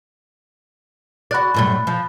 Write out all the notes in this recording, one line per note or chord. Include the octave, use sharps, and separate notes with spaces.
F#4 D5 B5 F#6 A6
F#2 A2 G3
F3